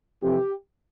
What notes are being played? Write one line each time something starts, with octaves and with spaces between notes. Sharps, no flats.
F2 C3 E3 G4